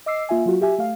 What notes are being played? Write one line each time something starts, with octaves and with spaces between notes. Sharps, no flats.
D#5 D6 E6 C7
A#3 F4 E5 G#5
F#3 F4 F#4
G4 E5 G#5
A3 F5